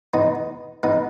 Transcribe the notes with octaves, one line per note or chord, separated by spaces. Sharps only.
B3 D#4
B3 D#4